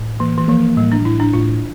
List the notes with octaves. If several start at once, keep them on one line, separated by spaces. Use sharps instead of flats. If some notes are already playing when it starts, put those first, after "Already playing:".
Already playing: A2
E3 A#3
E3
F3 A#3
A2 G3
D4
A2 E4
D4
A2 F4